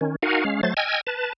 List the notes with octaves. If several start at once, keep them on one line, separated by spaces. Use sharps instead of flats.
D#3 C#4
D#4 F#4 A#4 F5 F#5 G#5
G#3 C#4 F5
F#3 A3 C5 A6
D#5 G5 G#5 E6 F6 G#6
B4 A5